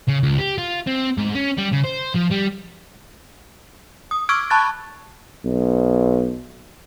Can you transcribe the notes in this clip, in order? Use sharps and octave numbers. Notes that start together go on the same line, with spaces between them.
C#3
C#2
G4
F4
C4
G#2
C#4
G3
C#3
C5
F3
G3
D#6
C#6 D6 E6 F6 G#6 D7
A5 B5 C#6 F#6 G#6 A6
B1